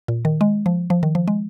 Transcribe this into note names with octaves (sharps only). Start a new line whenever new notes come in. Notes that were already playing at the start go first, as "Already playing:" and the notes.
A#2
D#3
G#3
F3
F3
D#3
F3
G#3